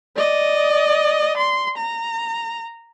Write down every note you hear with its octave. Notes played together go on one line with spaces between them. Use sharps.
D5 D#5
C6
A#5